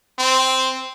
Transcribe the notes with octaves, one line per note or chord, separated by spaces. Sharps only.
C4